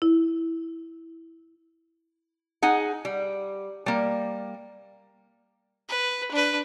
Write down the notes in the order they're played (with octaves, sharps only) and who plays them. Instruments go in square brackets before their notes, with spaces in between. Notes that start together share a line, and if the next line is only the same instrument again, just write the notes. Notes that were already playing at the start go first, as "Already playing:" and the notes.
[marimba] E4
[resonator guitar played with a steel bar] D#4 G#4 F#5
G3
G3 A#3
[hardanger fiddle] B4
D4 B4